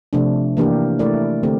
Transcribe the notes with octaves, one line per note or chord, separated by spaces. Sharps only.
C3 F3 A3 D4
E3 A#3 D4 G4 A#4
A3 E4 A#4 D5
D3 A3 C4 G4